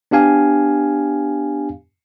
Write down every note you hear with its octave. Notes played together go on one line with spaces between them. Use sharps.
B3 D4 G4 F5 G#5